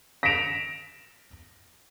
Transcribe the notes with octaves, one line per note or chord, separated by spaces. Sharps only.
A#6 B6 C#7 D7 E7 F7